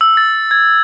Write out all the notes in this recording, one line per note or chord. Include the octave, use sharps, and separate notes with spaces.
E6
A6
G#6